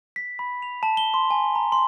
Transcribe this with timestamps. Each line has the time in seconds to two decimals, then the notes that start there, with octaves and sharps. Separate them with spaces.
0.16 B6
0.39 B5
0.62 F7
0.83 A5
0.97 G7
1.14 C6
1.31 G#5
1.55 A#5
1.72 C6